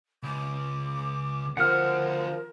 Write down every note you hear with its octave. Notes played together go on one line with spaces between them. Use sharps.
C#2 D6
D3 F3 F#4 A#4 F#5 F6